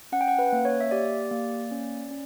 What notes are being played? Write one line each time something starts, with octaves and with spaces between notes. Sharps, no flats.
C#4 F#5
G5
F#5
B4
A#3
C#5
E5
G4 D5
A#3
C#4
C#4